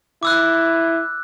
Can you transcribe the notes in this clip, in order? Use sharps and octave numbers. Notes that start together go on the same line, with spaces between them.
E4 D6 E6 F#6